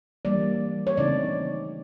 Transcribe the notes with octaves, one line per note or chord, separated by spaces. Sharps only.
E3 G3 A#3 D5
C#5
C#3 E3 A3 C4 D#4 D5